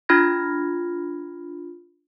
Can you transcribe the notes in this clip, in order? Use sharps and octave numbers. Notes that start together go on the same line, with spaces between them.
D4 F4 B5 F6 G#6 A#6